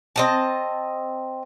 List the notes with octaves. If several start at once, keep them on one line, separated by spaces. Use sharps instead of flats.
C4 D#5 A5